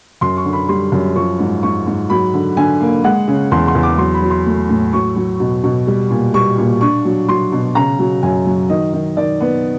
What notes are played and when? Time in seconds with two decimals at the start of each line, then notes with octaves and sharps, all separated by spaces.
0.21 F#2 C6
0.37 C#6
0.45 D3
0.53 B5
0.69 G3 C6
0.92 F#2
1.16 F3 C#6
1.39 G#2
1.63 G#2 C#6
1.86 G#2
2.10 F#3 B5
2.34 D3
2.57 D3 G#5
2.81 A#3
3.04 G#3 F#5
3.28 C#3
3.51 E2 C6
3.67 C6
3.75 E2
3.83 D6
3.98 F#3 C6
4.14 B5
4.22 F#3
4.30 C6
4.45 A3
4.69 A2
4.93 F#3 C#6
5.16 F#3
5.40 B2
5.64 B2
5.87 G3
6.11 A#2
6.34 G3 C#6
6.58 A#2
6.81 D4 C#6
7.05 F#3
7.28 F#3 C6
7.52 B2
7.75 C#3 A#5
7.99 F#3
8.23 F#2 G#5
8.46 F#3
8.70 D#3 D#5
8.93 D#3
9.17 D#3 D5
9.41 B3